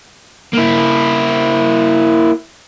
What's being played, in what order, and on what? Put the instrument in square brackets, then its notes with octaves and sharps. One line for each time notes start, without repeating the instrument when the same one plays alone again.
[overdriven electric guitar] A#3 E4